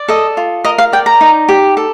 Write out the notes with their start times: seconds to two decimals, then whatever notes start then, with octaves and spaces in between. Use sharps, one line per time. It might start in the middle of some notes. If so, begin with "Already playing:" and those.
Already playing: D5
0.08 A4 D#5
0.37 F4
0.65 A#4 D#5
0.78 F5
0.93 D5 G5
1.06 A#5
1.21 D#4
1.49 G4
1.77 A4